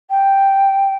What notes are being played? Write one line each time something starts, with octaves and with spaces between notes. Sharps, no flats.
G5